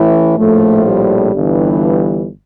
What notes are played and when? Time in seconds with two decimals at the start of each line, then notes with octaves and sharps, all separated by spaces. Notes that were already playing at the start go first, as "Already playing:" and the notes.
Already playing: A1 A2 E3 E4
0.37 A#1 A2 F3 A3
0.85 G3
1.32 G1 G2 E3